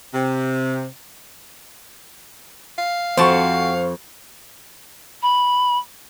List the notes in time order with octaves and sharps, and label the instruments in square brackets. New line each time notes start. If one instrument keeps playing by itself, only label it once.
[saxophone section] C3
[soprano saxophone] F5
[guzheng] F2 A5 [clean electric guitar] C4 F#4 [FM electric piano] C5 C#6
[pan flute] B5